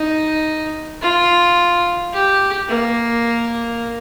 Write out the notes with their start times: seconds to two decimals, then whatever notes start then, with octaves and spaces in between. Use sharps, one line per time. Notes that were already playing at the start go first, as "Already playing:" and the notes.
Already playing: D#4
1.02 F4
2.13 G4
2.68 A#3